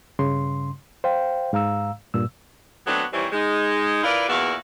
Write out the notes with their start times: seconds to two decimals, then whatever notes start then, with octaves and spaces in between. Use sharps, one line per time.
0.19 G2 C#3 C6
1.04 C5 F5 G5
1.53 G#2 F5 A#5 E6
2.14 G2 A#2 E6
2.87 F#3 A3 B3 C4 D4 F#4
3.12 D#3 E3 G3 C4 C5 C#5
3.32 G#3 D#4
4.04 E4 F4 A#4 B4 D5
4.28 E2 A#2 E4 F#4 F5